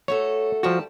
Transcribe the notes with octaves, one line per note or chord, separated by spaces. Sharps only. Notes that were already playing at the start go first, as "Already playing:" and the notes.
A3 F#4 A4 C#5
F3 G3 F#4 G5 A5